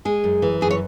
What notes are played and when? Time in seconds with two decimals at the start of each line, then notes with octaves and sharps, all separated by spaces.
0.05 G#3 G#4
0.24 F#2
0.42 E3
0.61 F#2 G#4
0.71 C#5